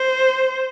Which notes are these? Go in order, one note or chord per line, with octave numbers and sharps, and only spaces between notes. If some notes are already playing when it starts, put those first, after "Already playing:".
Already playing: C5